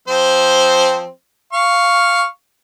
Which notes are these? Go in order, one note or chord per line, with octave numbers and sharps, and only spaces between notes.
F3 C4 C5
F5 C#6